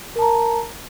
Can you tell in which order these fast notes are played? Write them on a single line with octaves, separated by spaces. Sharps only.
A#4 A5 A#5